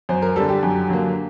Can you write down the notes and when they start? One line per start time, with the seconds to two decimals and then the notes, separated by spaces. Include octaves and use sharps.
0.09 F#2 C5
0.22 A#4
0.36 D3 G3 A4
0.49 G4
0.63 F#2
0.89 D3 F#3 A#3